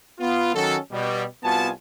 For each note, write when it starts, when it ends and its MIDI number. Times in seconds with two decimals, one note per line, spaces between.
0.20 0.53 59
0.20 0.53 65
0.54 0.77 51
0.54 0.77 54
0.54 0.77 61
0.54 0.77 66
0.54 0.77 69
0.92 1.24 47
0.92 1.24 55
1.44 1.69 36
1.44 1.69 59
1.44 1.69 65
1.44 1.69 66
1.44 1.69 80
1.44 1.69 81